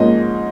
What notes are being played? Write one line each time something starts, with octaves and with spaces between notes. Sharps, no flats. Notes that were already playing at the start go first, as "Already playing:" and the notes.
Already playing: G#2 F3 A#3 C#4 D#5